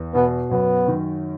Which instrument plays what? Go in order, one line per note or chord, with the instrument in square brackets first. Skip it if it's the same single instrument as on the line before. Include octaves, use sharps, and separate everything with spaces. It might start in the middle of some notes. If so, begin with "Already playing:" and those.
Already playing: [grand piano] E2
[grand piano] B2 [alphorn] B3
[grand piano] F#2 [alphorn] B3
[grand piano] D#3